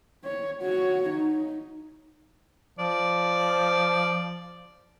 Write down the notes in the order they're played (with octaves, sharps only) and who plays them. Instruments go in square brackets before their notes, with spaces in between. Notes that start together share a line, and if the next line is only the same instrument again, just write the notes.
[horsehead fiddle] C#5
F#4 C#5
D#4
[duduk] F3 [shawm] D5